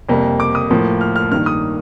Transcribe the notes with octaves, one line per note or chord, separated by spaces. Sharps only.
F2 C3 G3 A#3
D6
D#6
A2 F3 A#3
F6
F6
G2 D#3 A#3 F6
D#6